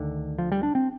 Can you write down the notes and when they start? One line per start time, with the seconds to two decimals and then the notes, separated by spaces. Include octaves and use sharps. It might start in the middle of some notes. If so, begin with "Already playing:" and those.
Already playing: D2 D3 D#3
0.38 F3
0.52 G3
0.63 D4
0.75 C4